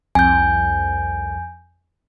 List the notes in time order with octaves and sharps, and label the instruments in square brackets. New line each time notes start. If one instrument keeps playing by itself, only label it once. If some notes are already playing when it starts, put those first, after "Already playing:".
[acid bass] C2 [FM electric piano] F2 [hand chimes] G#5 G6